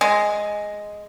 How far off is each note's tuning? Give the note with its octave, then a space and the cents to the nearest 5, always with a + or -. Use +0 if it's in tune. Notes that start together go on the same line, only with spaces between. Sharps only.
G#3 +0